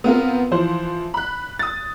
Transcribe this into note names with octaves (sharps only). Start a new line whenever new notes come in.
B3 C4 F4 A#4
E3 F3 C5
B5 F#6
D#6 A6